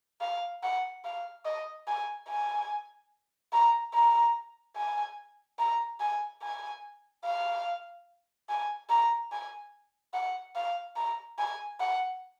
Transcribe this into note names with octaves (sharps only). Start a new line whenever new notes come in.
F5
F#5
F5
D#5
G#5
G#5
A#5
A#5
G#5
A#5
G#5
G#5
F5
G#5
A#5
G#5
F#5
F5
A#5
G#5
F#5